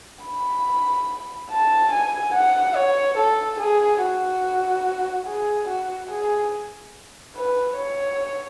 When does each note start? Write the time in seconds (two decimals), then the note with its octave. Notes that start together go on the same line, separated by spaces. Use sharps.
0.25 B5
1.51 A5
1.92 G#5
2.35 F#5
2.76 C#5
3.17 A4
3.60 G#4
4.02 F#4
5.27 G#4
5.68 F#4
6.11 G#4
7.36 B4
7.77 C#5